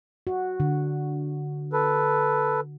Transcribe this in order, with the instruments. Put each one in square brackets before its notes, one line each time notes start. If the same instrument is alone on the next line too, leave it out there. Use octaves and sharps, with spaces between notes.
[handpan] F#4
D3
[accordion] A4 B4